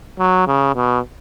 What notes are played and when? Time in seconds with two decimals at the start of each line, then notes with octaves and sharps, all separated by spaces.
0.19 F#3
0.47 C#3
0.75 B2